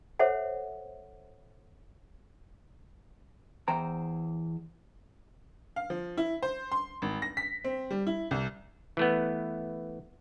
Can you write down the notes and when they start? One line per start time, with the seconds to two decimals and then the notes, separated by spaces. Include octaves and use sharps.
0.19 A4 C5 C#5 E5 F#5
3.68 E2 C5 G5 A#5
5.76 F5
5.90 F3
6.17 E4
6.42 C5
6.72 C6
7.02 G#1
7.22 A#6
7.37 B6
7.64 C4
7.90 G3
8.07 E4
8.31 C2
8.97 E3 A3 B3